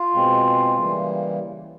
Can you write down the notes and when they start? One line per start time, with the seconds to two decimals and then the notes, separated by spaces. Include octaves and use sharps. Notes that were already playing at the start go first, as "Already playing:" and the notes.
Already playing: F4
0.14 B2 G#3 C4
0.76 C#3 E3 G3 A#3